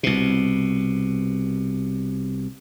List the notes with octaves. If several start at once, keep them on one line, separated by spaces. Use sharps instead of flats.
C2 B2